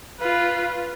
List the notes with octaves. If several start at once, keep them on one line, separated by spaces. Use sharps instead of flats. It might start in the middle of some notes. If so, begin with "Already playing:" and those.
F4 B4